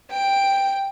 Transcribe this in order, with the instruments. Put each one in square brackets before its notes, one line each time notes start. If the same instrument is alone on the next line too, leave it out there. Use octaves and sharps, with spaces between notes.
[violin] G5 D7